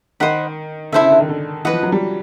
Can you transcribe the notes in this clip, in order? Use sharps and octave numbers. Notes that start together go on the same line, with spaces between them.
D#3 C5 D#5 F#5 B5
D3 E4 A4 C5 E5
C#3
D3
D#3
D3
E3 B4 D#5 F#5
F3
F#3
G3